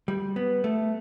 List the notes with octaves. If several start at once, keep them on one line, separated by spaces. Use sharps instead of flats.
G3
B3
A3